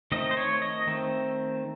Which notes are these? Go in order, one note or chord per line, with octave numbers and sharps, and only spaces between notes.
D#3 A3 C4 D#5
C5
C#5
D#5
D#3 A3 C4